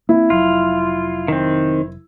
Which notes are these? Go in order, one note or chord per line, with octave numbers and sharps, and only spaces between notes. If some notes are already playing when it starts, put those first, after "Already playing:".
A#3 C4 E4
F1 F#3 F4
D#3 C4